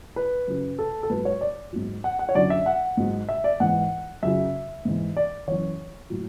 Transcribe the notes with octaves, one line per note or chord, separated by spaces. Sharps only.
B4
F#2 C#3 F#3
A4
A4
G#2 F#3 B4
C#5
D5
G#2 F#3
F#5
F#5
C#5
F#2 D3 F#3 D5
E5
F#5
G#2 F#3
E5
D5
G#2 E3 F#5
F#2 C#3 F#3 E5
G#2 E3
D5
F#2 E3 C#5
A2 F#3